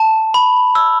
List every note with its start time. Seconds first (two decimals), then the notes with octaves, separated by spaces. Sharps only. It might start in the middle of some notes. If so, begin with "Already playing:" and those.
Already playing: A5
0.34 B5
0.75 E6